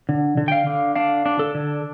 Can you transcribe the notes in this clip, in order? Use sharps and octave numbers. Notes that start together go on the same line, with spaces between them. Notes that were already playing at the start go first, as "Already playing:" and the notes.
D3
D3
G5
F5
D3
D4 F5
D4
A4
D3